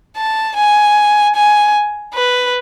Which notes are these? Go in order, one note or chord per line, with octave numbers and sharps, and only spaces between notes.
A5
G#5
G#5
B4